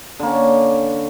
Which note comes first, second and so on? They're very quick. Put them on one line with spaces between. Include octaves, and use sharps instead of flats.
D3 A#3 C#4